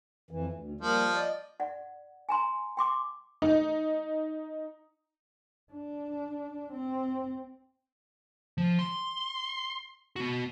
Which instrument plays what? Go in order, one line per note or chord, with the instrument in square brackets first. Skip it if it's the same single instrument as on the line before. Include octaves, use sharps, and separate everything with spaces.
[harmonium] F2 E3
D2
[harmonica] F3 [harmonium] G3 A#3
[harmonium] D5 D#5
[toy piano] D5 F#5
G#5 A#5 C6
G5 C6 D6
[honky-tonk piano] D#4
[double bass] D4
C4
[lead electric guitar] F3
C6
B3 F#4